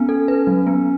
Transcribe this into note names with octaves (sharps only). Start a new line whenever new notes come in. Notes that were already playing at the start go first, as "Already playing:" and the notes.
Already playing: B3 C#4
A4
B4
F#3
B3